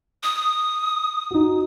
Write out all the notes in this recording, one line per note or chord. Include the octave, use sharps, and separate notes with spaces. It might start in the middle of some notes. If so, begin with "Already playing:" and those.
D#6
D#4 F#4